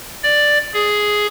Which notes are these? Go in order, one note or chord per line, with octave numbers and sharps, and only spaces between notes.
D5
G#4